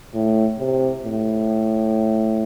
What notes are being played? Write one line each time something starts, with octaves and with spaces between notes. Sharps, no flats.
A2
C3
A2